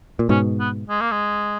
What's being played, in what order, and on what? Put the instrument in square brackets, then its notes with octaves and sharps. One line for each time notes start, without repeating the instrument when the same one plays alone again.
[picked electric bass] A#2
[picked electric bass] G#2 B2 [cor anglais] C#4
[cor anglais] B3
G#3
A#3
G#3